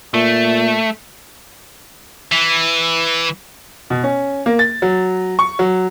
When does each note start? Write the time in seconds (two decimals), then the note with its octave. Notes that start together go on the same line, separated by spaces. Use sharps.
0.14 A#2 A3
2.32 E3
3.90 B2
4.04 C#4
4.46 A#3
4.59 A6
4.82 F#3
5.39 C#6
5.59 F#3